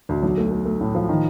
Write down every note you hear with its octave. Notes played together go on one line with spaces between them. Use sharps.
D2
B1
A3
A3
A3
A2
F3
D#3